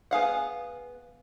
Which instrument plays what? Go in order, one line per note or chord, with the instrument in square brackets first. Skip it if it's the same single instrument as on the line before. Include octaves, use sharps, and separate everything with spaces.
[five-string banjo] B3 G#4 F5 F#5